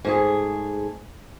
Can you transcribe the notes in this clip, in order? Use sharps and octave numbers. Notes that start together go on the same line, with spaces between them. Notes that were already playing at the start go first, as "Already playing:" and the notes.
G#2 A3 G#4